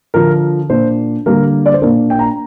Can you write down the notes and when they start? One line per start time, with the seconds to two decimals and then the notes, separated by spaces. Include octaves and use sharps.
0.14 D3 F3 D4 A#4
0.70 A#2 A#3 D4 C5
1.26 D3 G3 A#3 A#4
1.66 D5
1.74 C5
1.82 A#2 A#3 D4 A#4
2.10 G5
2.19 A#5